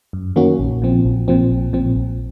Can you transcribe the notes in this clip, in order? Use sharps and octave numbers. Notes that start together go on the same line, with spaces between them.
F#2
D#3 A#3 C#4 F#4
A#1
A#2 F3 C4
A#1
A#2 F3 C4
A#1
A#2 F3 C4
A#1